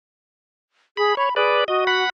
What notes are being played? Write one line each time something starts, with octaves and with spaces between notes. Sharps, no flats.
G#4 B5
C#5 B5
G#4 B4 D5
F#4 D#5
F#5 B5